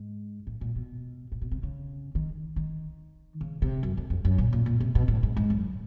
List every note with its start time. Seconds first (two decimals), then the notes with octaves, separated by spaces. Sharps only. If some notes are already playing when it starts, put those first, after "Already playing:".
Already playing: G#2
0.47 A2
0.61 A#2
0.76 B2
1.32 A#2
1.42 B2
1.51 C3
1.63 C#3
2.15 D#3
2.56 D#3
3.41 C#3
3.62 C3
3.83 F#2
3.97 F2
4.10 F2
4.25 F#2
4.38 A#2
4.53 A#2
4.66 A#2
4.80 C3
4.95 B2
5.08 A2
5.23 G#2
5.37 G#2
5.50 F#2